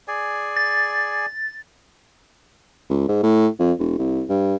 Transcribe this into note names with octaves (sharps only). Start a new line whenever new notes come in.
G#4 D5 G#5
A6
C#2
G#2
A2
F2
E1
C2
G2